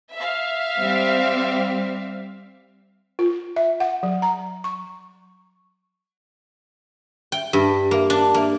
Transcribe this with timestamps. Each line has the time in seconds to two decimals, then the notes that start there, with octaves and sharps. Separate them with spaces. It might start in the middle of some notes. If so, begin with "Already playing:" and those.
0.14 E5 F5
0.78 G3 C4
3.19 F4
3.56 E5
3.80 F#5
4.03 F#3
4.22 A#5
4.64 C#6
7.32 G5
7.53 G2
7.91 A#3
8.10 D4
8.34 A#3